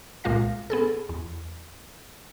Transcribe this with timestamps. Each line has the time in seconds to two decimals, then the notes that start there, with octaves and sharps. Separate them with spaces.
0.24 C2 A#2 G#3 F4 F5 A#6
0.70 B3 G#4 A4
1.09 E2